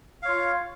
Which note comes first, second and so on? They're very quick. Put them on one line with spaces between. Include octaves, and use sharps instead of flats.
F5 C#5 F4